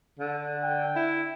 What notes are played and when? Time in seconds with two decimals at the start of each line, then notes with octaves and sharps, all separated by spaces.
0.19 D3
0.64 G5
0.96 E4